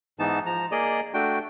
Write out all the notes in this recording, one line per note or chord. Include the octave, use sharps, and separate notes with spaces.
G#2 E3 B3 D#4 A5
F3 A#5
A#3 G#4 D5 D#5
A3 D4 F#4 G5